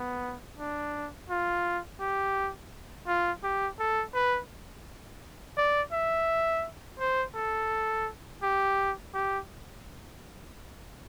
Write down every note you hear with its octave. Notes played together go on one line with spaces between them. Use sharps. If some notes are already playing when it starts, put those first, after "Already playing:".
Already playing: B3
D4
F4
G4
F4
G4
A4
B4
D5
E5
C5
A4
G4
G4